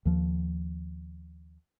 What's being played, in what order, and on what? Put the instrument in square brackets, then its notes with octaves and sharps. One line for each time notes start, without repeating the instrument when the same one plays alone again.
[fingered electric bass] D#2 F3